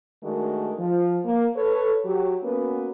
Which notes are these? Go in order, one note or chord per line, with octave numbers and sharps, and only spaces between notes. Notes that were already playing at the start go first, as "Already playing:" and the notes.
D#3 G#3 A3 D4 F#4 A#4
F3
A#3
A4 B4 C#5
F#3 G4
A#3 B3 C#4 F#4 B4